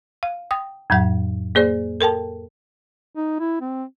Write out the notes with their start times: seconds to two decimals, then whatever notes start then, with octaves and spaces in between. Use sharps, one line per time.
0.23 F5
0.51 G5 D#6
0.90 F2 A2 F#3 F#5
1.55 A#3 G#4 C5 D5
2.01 A4 A#4 G5 A5
3.15 D#4
3.40 E4
3.61 C4